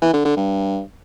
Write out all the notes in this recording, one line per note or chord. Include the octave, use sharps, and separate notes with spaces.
E3
D3
D3
G2